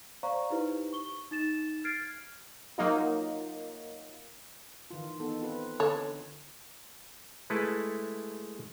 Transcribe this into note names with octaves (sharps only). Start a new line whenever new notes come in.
C5 D5 F5 A#5 C#6
D#4 E4 G4 B4 C5
C#6 G7
D#4 A6 E7
F6 G#6 A6 C7 D7
F#3 A#3 D#4 F4
D#3 E3 F4
B3 D#4 A4
C4 F4 B4
D3 A4 C#5
G#3 A3 E4 A4 B4